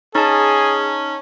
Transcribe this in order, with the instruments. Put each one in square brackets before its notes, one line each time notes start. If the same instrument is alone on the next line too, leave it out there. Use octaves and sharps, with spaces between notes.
[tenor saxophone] C#4 [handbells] D#4 A5 [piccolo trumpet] G#4